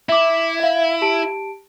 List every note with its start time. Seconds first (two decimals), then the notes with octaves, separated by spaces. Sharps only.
0.09 E4 E5 D6
0.60 E5 F5
1.02 G4 A5 D7